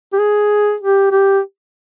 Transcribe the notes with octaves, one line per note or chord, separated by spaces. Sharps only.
G4
G#4
G4
G4